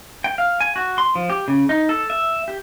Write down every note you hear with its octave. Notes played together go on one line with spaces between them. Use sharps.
G5
F5
G#5
F#4
C6
F3
G4
C#3
D#4
A4
E5
G4